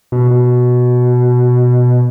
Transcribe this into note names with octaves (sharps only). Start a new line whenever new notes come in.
B2
B2